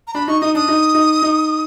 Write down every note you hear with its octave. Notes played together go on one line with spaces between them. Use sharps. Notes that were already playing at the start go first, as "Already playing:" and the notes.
A#5
D4 B5
D#4 C#6
D#4 D#6
D4 D#6
D#4
D#4
D#4